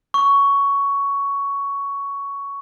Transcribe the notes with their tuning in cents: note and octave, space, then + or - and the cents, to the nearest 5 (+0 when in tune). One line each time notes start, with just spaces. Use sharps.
C#6 +10